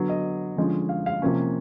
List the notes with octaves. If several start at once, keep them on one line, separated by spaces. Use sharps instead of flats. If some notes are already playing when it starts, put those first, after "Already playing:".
Already playing: D3 F#3 B3
D#5
D3 F3 G#3 C#4
F5
F5
C3 F3 A#3 C#4